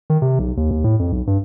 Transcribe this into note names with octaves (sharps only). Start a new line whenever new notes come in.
D#3
C3
B1
D#2
D#2
A2
F2
B1
G2